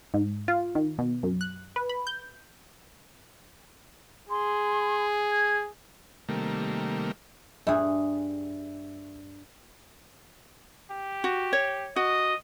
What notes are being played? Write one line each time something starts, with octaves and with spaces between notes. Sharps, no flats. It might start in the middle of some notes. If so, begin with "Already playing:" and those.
G#2
F4
D#3
B2
F#2
F#6
B4
B5
G6
G#4 C6
G#6
C3 D#3 G3 A3 A#3
G2 G#4 E5
G4
F#4
C#5
F#4 D#5